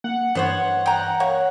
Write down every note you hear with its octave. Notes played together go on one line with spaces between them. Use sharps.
A#3 F#5
G2 E3 B3 C5 C#5
G5 A#5
A#3 C#5 F#5